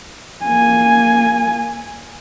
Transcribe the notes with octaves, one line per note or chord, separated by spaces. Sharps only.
A#3 G#5